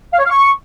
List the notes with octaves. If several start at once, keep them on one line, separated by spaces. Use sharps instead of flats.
F5
C#5
F5
C#6